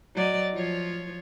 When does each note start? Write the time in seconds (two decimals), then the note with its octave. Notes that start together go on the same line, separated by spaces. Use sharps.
0.15 F#3 D5 D#5
0.53 F3 F4 C#5